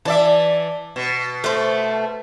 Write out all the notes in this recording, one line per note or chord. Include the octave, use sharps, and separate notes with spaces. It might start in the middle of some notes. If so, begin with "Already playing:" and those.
E3 D5 E5 A5
B2
A3 C5